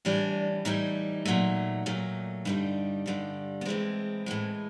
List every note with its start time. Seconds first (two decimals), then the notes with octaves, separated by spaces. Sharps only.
0.05 A2 E3 G3 D4
0.65 A2 E3 G3 D#4
1.25 A#2 F#3 A3
1.86 A#2 F#3 A3
2.45 G2 D3 G3 D#4
3.06 G2 D3 G3
3.61 B3
3.65 A2 E3 G#3 C4
4.26 A2 E3 G#3